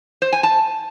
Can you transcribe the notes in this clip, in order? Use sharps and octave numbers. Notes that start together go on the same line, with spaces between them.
C5
G#5
A5